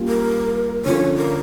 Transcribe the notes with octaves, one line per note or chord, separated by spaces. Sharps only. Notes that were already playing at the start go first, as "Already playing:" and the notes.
Already playing: G3 A#3 C#4 F4
A#4
D3 F3 C#4 F4 C#5
A#4